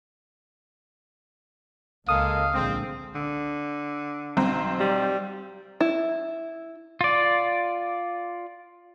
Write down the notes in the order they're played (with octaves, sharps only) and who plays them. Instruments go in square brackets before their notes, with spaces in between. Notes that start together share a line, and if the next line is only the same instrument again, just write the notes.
[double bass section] C#2 [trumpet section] G#3 A#3 A4 [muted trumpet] F5 [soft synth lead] D#6
[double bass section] A#1 D3 G#3 [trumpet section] C4
[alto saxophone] D3
[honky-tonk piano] B1 C4 A#5
[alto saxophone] G3
[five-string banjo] E4
[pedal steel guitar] F4 D5